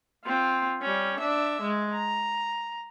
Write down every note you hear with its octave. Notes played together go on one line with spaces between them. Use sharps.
C4 F4
G3 C#4
D4 E5
G#3
A#5